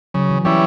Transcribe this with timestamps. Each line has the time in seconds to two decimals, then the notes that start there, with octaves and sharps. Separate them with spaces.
0.14 C#3 F#3
0.30 E3
0.45 E3 G3 C#4 E4